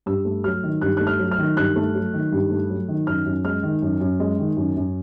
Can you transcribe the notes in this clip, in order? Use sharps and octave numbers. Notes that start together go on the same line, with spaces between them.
G2 E6
A3
F#3 F6
D#3
G2 F#6
A3 F#6
F6
F#3
F6
D#3
G2 F#6
A3
F#3
D#3
G2
A3
F#3
D#3
F#2 F6
F#2
G#3 F6
D#3
F#2
F#2
G#3
D#3
F#2
F#2